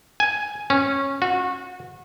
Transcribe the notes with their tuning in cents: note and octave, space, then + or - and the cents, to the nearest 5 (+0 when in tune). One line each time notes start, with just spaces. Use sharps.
G#5 +5
C#4 -15
F#4 -25